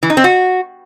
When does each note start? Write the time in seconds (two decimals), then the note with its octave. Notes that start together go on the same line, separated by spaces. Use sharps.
0.03 E3
0.10 D#4
0.17 C4
0.24 F#4